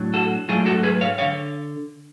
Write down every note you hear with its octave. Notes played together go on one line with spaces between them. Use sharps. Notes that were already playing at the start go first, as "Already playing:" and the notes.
Already playing: A2 F#3 D4
F#4 A4
G#2 F#3 A3 D4 F4 G#4
F#4 A4
G#4 B4
C#5 F5
D3 C#5 F5